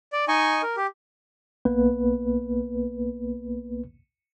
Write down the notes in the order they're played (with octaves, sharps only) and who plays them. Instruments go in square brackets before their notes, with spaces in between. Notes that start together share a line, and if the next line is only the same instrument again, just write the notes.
[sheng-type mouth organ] D5
D#4 D#5 G#5 C#6
A#4
G4
[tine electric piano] B1 A#3 B3 B4